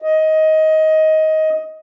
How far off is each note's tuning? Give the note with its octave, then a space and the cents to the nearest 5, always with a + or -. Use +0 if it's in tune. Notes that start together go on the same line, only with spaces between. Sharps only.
D#5 +15